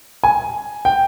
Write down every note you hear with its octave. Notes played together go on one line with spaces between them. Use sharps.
G#5
G5